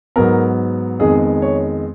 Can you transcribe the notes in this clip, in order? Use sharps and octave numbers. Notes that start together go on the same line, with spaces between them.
G#2 F#3 B3 A#4
F2 D#3 G#3 B3 G#4
C#5